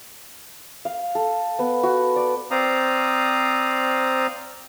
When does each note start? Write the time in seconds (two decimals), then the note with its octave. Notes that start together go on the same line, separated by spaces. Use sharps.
0.85 F5
1.15 A4
1.59 B3
1.83 F#4
2.16 D5
2.51 C4 C5 D5 F5 A#5 D#6